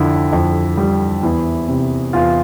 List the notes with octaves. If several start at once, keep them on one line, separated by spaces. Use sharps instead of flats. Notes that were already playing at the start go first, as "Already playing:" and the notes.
Already playing: F2 D3 E4
F2
G3
E2 E4
C3
E2 F4